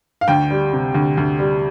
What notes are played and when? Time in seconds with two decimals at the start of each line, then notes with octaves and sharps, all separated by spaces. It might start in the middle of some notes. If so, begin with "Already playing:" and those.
0.21 F5
0.28 D2 G5
0.51 G3
0.73 C3
0.94 D2
1.17 D2
1.39 G3